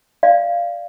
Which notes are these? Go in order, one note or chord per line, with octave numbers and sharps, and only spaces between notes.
D5 F5